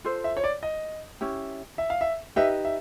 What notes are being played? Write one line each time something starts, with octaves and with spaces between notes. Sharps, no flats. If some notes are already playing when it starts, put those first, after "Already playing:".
F4 A4 C5
E5
C#5
D5
D#5
C#4 E4 G4
E5
F5
E5
D#4 G4 B4 D#5 E5
E5